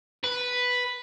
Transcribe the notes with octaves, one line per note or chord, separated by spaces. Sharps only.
B4